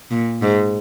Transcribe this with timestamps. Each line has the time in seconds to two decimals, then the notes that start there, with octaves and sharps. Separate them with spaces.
0.11 A#2
0.42 G#2